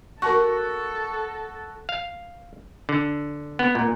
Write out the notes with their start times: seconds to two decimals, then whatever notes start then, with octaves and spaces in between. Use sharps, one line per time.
0.22 F#4 A4 A#4 A5 C#6
1.89 F5
2.89 D3
3.59 B3
3.75 A#2